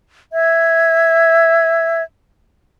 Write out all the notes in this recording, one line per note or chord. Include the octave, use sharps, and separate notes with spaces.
E5 G#6